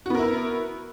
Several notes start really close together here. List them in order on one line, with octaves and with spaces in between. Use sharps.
F#4 B3 A#4 E4